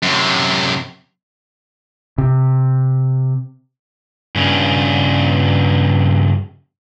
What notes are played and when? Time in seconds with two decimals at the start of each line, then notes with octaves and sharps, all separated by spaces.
0.02 F#2 C3
2.18 C3
4.36 G2 C#3